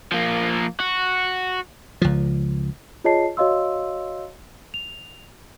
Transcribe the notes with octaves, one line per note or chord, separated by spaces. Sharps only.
F3 A#3
F#4
C#2 F3
F4 G#4 C#5 D#5 A5 C7
F#4 C#5 D#5 F5 C6 E6
F7